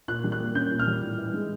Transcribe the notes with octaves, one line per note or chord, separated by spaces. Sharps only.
A#2 F#6
G3
F#6
A#3
C#4 G6
A#2
F6
G3
A2
E3
G#3